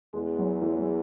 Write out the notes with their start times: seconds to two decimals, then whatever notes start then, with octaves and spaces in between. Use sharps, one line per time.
0.13 E2 G#3
0.39 F#3
0.62 E3
0.79 F#3